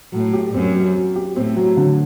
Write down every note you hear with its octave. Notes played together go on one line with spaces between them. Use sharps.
A2 F#3
G4
F#2 C4
F#3
F#3
G4
A2 C4
F#3
D3